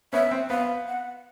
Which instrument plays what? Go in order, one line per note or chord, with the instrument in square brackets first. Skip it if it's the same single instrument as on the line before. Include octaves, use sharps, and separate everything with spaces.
[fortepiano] B3 C#4 [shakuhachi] E5
[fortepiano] C4
[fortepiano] B3 [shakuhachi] F5
[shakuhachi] F#5